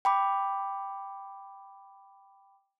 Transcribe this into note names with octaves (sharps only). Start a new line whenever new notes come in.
G5 B5 D6